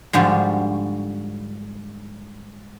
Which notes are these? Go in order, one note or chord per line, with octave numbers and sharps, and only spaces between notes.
G#2 D3 F3 G3 F#4